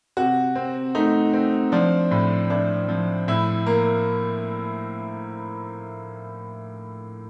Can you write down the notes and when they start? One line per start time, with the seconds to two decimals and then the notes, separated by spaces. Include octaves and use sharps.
0.17 C3 F#4
0.55 C4
0.95 A3 D#4
1.33 C4
1.72 F3 D4
2.11 A2
2.50 A2 D4
2.89 F3
3.28 A2 E4
3.66 A#3